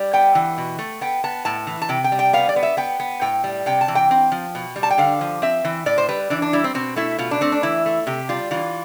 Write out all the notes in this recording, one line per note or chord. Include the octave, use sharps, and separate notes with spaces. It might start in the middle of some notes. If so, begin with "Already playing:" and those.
Already playing: G3
B3 G5
E3
B2
A3
B3 G5
B3 A5
A2 A5
E3
A5
C3 G5
G5
G3
G5
B3 F5
D5
B3
E5
B3 G5
B3
A2 G5
G3
C3 G5
A5
E3
G5
C4
F3
B2
G3
A5
G5
D3 F5
F3
C4 E5
E3
A2 D5
C5
G3 B4
E3 D4
D4
G3 E4
C4
B2 C4
A3 E4
B2 F4
D4
A3 C4
D4
E3 E4
A3
C3 G4
G3 F4
E3 F4